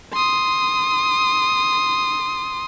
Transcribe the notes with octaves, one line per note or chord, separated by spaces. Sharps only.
C6 D#6